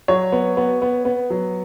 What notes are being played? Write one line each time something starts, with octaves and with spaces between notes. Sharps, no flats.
F#3 C#5
B3
B3
B3
B3
F#3